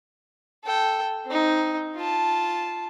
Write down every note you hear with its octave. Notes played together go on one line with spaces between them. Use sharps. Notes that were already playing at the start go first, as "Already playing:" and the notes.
A4 G5
C4 D#4
F4 A5